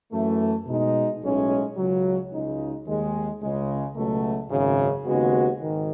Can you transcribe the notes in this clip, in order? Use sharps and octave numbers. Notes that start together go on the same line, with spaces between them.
F#2 E3 A3
B2 G#3 D#4
B1 A2 G#3 C#4
C#2 C#3 F#3
C#2 C#3 G#3 D#4
D#2 D#3 G#3
C#2 C#3 G#3
C#2 B2 F#3 A3
G#1 F#2 C#3
D#2 C#3 G#3 B3 F#4
G#1 G#2 D#3